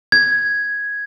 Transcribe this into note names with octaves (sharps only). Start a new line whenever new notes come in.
G#6